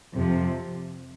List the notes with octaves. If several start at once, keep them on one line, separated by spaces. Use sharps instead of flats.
F2 C3 F3